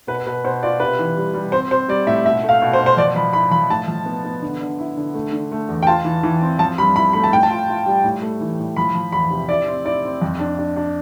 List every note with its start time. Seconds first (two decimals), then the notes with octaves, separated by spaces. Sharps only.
0.07 B2 B4
0.26 B2 B4
0.44 B2 C5
0.62 F4 D5
0.80 C3 B4
0.99 E3
1.17 G3
1.34 G3
1.52 C4 C5
1.71 C4 C5
1.88 G3 D5
2.06 A2 E5
2.25 B2 E5
2.43 A3
2.49 F5
2.62 B2
2.73 C5
2.79 B2
2.86 C5
2.97 F3 D5
3.16 F3 B5
3.33 E4 B5
3.51 F3 B5
3.70 A2 A5
3.88 F3
4.06 B3
4.24 B3
4.42 D3
4.61 D3
4.79 E4
4.97 D3
5.14 A3
5.32 D3
5.52 A3
5.68 E2
5.83 G5
5.87 F4 A5
6.05 E3
6.23 E3
6.42 C4
6.59 F3 A5
6.78 G2 B5
6.96 E4 B5
7.13 A3 B5
7.24 A5
7.32 A2 G5
7.43 A5
7.50 F4
7.68 F4
7.86 G3
8.04 A2
8.22 A3
8.41 E3
8.59 A2
8.76 F3 B5
8.95 F3
9.12 E2 B5
9.31 C3
9.49 E4 D5
9.67 C4
9.85 E4 D5
10.04 C4
10.21 F2
10.39 D4
10.58 D4
10.76 D4